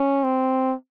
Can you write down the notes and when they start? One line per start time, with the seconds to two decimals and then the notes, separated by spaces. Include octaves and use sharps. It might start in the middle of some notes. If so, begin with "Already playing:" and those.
Already playing: C#4
0.24 C4